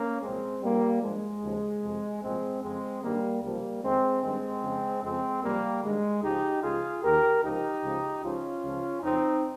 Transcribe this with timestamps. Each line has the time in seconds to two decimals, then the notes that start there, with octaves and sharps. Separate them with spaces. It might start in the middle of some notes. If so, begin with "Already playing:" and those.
Already playing: A#3 C#4
0.22 C2 A#2 F3 G#3 C4
0.62 G2 F3 G3 A#3
1.02 G2 F3 G#3
1.43 D#2 C#3 F3
1.82 F2 C3 F3
2.22 C2 A#2 F3 G#3 C4
2.62 F2 C#3 F3 G#3 C4
3.03 G2 D#3 G3 A#3
3.42 C#2 C3 F3 G3 A#3
3.82 F2 D#3 G#3 C4
4.23 G2 D#3 G#3 C4
4.62 F2 C#3 F3
5.02 F2 C#3 F3 G#3 C4
5.42 C#2 C3 F3 G3 A#3
5.82 G2 D#3 G#3
6.23 C#2 C#3 F3 D#4 G4
6.63 C#2 C#3 F3 F4 G#4
7.02 D#2 D#3 G4 A#4
7.43 C#2 C3 F3 D#4 G4
7.83 C#2 C#3 F3
8.23 C#2 C#3 F3 C#4 F4
8.63 C#2 C#3 F3
9.02 F2 C#3 F3 C4 D#4